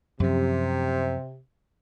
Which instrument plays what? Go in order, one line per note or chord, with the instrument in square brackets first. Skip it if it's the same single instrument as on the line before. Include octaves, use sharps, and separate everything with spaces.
[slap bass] F#2 F3 [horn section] C3